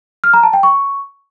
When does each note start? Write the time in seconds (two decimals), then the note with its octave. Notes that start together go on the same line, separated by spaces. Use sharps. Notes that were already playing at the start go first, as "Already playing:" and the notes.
0.24 F6
0.34 A#5
0.43 A5
0.53 G5
0.63 C#6